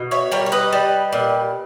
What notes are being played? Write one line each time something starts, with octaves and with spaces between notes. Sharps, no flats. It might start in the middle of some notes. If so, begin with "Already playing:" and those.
Already playing: B2
C#5 E5
G3 A#4 C#5
C#5
B4 D#5
G3
A#2